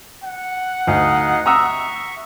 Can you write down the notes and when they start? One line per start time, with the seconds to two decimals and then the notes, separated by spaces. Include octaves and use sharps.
0.24 F#5
0.87 D2 D#4 D#5 F5
1.46 E5 A#5 C#6 D#6 E6